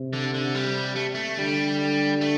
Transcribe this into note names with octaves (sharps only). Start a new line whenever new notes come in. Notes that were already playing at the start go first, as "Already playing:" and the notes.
Already playing: C3
D3
D3
G3
A3
A3
D3 G3
A3